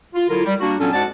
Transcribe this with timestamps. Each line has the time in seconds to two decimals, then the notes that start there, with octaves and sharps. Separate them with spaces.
0.15 F4
0.29 D3 F#3 E4 F4 A#4
0.45 G3
0.60 G3 A#3 D4 F#4
0.80 A#2 F#3 B3 C#4 D4 A4
0.92 G#2 G#3 F#4 D5 F#5 A5